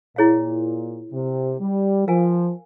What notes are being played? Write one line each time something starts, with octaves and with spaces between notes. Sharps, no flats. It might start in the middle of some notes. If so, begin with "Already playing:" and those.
A#2 E4 G#4 C#5 F5
C3
G3
F3 A#4 F5 G#5